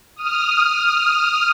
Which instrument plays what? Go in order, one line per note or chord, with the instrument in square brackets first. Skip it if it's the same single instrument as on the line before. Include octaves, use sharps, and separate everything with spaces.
[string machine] D#6 F6